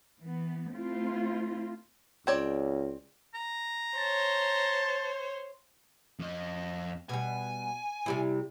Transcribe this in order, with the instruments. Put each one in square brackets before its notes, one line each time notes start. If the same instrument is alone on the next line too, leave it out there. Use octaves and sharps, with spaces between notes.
[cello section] E3 B3
A3 C4 E4 F4
[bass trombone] C#2 [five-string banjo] C4 C#5 D5
[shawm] A#5
[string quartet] C5 C#5 [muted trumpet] A5
[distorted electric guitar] F2 D#5
[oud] B2 G3 [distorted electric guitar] G#5
[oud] C3 G3 E4